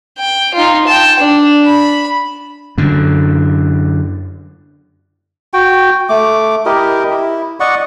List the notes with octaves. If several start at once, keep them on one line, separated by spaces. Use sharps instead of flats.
G5
D#4 F4
G5 A5
D4
B5
F#2 D3
F#4 G5
A3 D6
E4 G4 A#4 D#5
E4
D5 D#5 F#5 C#6